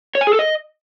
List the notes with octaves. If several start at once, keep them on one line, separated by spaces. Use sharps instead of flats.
C#5
G#5
G#4
A4
D#5